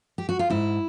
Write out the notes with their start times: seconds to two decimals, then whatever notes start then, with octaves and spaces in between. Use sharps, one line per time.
0.18 G4
0.29 F#4
0.39 F4
0.50 G#2 E4